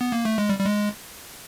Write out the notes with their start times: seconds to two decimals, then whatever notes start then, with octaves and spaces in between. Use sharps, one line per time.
0.01 B3
0.12 A#3
0.25 A3
0.38 G#3
0.49 G3
0.60 G3
0.66 G#3